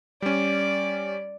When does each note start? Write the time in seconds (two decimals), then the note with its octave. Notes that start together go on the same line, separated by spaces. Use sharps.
0.22 G3 C#4 D5